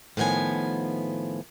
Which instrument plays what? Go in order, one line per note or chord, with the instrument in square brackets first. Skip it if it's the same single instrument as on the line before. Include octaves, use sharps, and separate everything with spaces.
[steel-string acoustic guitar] A2 D#3 F3 B3 G#5